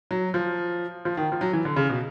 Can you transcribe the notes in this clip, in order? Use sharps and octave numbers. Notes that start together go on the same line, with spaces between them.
F#3
F3
F3
D#3
F3
F#3
E3
D3
C#3
B2